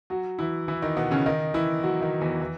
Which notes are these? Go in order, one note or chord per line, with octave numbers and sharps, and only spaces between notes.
F#3 F#4
E3 E4
E3 E4
D#3 D#4
B2 B3
C#3 C#4
D#3 D#4
E3 E4
F#3 F#4
D#3 D#4
E2 E3
E3